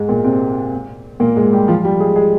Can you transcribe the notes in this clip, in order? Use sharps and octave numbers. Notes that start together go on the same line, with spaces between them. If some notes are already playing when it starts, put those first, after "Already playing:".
Already playing: G#2 G#3
A#2 A#3
C3 C4
A#2 A#3
G#2 G#3
G3 G4
F3 F4
G3 G4
G#3 G#4
G#3 G#4